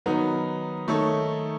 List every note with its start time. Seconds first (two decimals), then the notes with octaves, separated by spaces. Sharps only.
0.06 D#3 F#3 B3 D#4
0.88 D#3 A3 D#4 A4 C#5